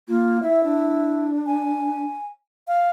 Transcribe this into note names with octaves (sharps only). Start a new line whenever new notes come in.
A#3 F4
E4 E5
D4
G#5
F5